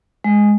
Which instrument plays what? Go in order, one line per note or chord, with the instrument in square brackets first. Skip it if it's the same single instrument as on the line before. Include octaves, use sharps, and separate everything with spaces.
[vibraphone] G#3